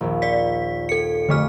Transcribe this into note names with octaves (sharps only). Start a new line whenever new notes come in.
A#1 D#2
D5 B6
A4 C#7
F2 D3 A3 C#6 D6 F6